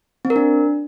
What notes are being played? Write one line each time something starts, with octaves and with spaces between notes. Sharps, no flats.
C4
A#4
D4